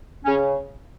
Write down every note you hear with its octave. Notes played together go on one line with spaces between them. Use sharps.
C#3 C#4